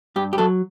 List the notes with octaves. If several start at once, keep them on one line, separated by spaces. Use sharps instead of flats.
G2 G4
G4
F#3 A4